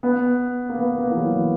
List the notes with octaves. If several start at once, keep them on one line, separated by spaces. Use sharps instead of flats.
B3
A#3
B3
A#3
E3
F#3
E3